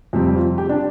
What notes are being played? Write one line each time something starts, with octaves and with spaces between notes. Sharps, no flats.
F2 C3 G3 C4
F4
G4
D4